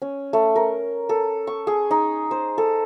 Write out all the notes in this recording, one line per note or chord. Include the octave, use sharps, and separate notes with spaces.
C#4
A3
A#4
A4
C#6
G#4
D#4
C5
A4